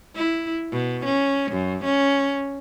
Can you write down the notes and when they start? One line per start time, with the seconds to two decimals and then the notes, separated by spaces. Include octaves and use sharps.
0.16 E4
0.72 B2
1.05 C#4
1.52 F#2
1.84 C#4